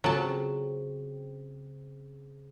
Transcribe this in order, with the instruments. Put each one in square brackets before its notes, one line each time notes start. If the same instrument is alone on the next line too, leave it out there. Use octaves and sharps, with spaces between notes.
[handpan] C#3 C4 [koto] F#3 A5 [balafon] F4 A4 C#5